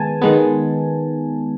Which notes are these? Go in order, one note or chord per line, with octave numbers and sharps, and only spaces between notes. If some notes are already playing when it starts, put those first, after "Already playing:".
Already playing: D#3 G#3 B3 G#5 A5
D#3 G#3 B3